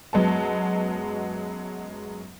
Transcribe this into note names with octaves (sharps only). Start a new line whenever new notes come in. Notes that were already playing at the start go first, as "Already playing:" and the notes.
F#2 F#3 G#3 B3 A5